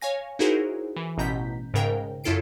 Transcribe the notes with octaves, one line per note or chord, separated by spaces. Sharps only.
C#5 F5 G#5 A#6
D#4 E4 F#4 G#4 A#4 C5
E3
A1 B2 A#5 G6 B6
G#2 C#3 A#4 G5
F#2 E4 F4 A4 C7 D7